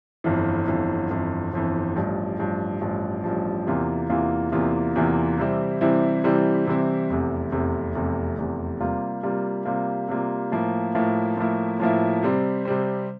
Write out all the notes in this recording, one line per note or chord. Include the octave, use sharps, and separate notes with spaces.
G1 F2 E3
G1 F2 E3
G1 F2 E3
G1 F2 E3
A1 G2 F3
A1 G2 F3
A1 G2 F3
A1 G2 F3
E2 C3 E3 A#3 F4
E2 C3 E3 A#3 F4
E2 C3 E3 A#3 F4
E2 C3 E3 A#3 F4
C3 E3 G3 C4 E4
C3 E3 G3 C4 E4
C3 E3 G3 C4 E4
C3 E3 G3 C4 E4
F1 E2 C3
F1 E2 C3
F1 E2 C3
F1 E2 C3
C3 G3 A#3 F4
C3 G3 A#3 F4
C3 G3 A#3 F4
C3 G3 A#3 F4
A2 F3 A#3 E4
A2 F3 A#3 E4
A2 F3 A#3 E4
A2 F3 A#3 E4
C3 G3 C4
C3 G3 C4